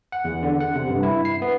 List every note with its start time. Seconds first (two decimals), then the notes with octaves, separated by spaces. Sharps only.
0.12 F#5
0.25 E2
0.43 D3
0.60 F#5
0.75 C3
0.89 G2
1.03 E4
1.25 C7
1.42 B3